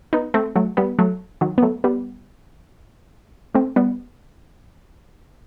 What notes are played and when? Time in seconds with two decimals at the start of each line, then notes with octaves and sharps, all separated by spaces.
0.13 B3 D#4
0.34 A3 C4
0.56 F#3 A3
0.77 G3 B3
0.99 F#3 A3
1.41 D#3 F#3
1.58 B3
1.62 F#3 A3
1.84 G3 B3
3.55 A3 C4
3.76 G3 B3